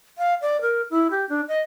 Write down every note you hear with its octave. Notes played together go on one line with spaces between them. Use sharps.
F5
D5
A#4
E4
G4
D4
D#5